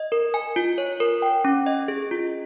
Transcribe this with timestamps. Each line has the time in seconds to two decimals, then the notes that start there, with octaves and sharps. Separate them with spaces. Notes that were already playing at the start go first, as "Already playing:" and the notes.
Already playing: D#5
0.12 A#4
0.34 G#5
0.56 F4
0.78 C#5
1.00 A#4
1.22 G5
1.45 C#4
1.66 D#5
1.88 G#4
2.11 F4